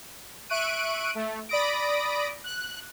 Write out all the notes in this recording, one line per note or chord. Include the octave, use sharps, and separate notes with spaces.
E5 C#6 F#6 D7 D#7
A3
D5 B5 D#6 A#6 D7
F#6